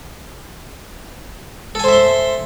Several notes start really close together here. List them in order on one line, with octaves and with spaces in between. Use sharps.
A4 G#5 C5 E5 C6